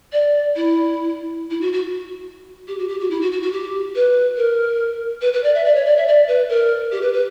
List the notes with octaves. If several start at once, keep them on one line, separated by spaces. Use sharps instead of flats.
D5
E4
E4
F#4
F#4
G4
F#4
G4
F#4
E4
F#4
F#4
F#4
G4
B4
A#4
B4
B4
D5
E5
D5
C#5
D5
E5
D5
B4
A#4
G4
B4
B4